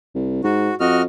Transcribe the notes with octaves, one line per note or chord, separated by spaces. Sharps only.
C2
G#2 F#4
F2 F#4 D#5 F6